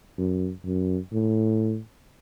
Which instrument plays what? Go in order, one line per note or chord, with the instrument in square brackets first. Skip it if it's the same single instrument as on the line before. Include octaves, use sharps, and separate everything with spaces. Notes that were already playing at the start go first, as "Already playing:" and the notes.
[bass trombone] F#2
F#2
A2